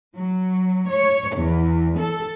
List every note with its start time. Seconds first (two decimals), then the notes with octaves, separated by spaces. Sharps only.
0.15 F#3
0.89 C#5
1.37 E2
2.00 A4